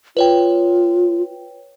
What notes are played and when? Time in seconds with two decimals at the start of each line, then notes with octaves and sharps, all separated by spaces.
0.17 F4 B4 C#5 G5